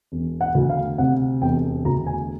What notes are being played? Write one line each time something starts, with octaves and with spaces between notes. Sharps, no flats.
E1
F#5
D2
F5
C3 F#5
E1 G5
D2 A#5
G#5